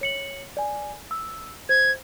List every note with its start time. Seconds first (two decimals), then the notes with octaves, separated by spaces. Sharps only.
0.01 C#5 C#7 F#7
0.57 D5 G#5
1.11 E6
1.69 C5 G#6